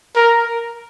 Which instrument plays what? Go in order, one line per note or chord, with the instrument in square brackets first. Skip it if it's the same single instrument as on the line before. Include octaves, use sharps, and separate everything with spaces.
[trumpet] A#4